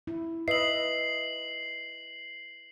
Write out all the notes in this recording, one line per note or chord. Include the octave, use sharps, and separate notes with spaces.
E4
B4 D#5 E5 C7 F#7